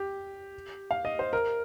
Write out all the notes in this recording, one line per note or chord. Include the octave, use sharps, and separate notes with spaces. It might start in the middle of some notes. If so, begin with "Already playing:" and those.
Already playing: G4
F5
D#5
C5
A#4